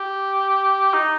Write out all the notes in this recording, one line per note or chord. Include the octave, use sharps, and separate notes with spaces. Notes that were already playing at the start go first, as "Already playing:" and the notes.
Already playing: G4
D#4